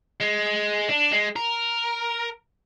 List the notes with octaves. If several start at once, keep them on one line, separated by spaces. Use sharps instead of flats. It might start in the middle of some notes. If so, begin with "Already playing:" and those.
G#3
D4
G#3
A#4